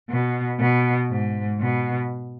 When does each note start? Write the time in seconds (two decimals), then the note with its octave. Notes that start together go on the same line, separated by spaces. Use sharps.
0.10 B2
0.60 B2
1.10 G#2
1.60 B2